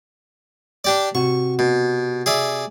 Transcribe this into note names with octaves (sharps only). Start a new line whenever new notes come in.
D4 G4 D5
C3 F#4 C#6
B2
G#4 D5 E5